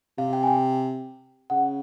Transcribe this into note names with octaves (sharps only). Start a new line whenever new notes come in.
C3 F5
G5
G#5
G5
C#3 F#5